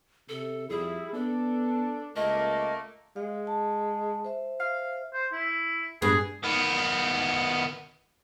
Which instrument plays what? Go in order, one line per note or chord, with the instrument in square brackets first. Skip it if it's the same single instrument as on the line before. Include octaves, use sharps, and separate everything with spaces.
[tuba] C3 [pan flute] A4
[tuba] F2 [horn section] G3 E4 [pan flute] G#4
[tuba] B3 [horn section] D4 [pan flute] A4
[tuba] C#2 [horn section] A3 A#3 [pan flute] D#5
[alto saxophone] G#3 [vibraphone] F5
[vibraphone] A5
C5 E5
[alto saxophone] F5
[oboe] C5
E4
[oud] G2 B3 [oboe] G#4
[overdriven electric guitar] D#3 B3